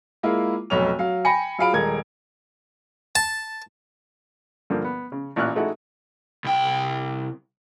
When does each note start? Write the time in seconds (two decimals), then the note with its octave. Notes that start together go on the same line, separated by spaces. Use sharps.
0.23 G#3 A#3 E4 F4
0.70 F1 B1 C#5 F7
0.99 F#3 F5
1.25 G5 G#5 B5 A#6 C#7
1.58 F#3 F4 G#4 F5 B5 D7
1.73 D#1 G#3 A#4 G#6
3.15 A5
4.70 G2 D3 F3 A#3
4.84 B3
5.12 C#3
5.36 A1 A#2 E4 F6 F#6
5.55 G#3 A3 D#4 E4 F#4
6.44 C2 G5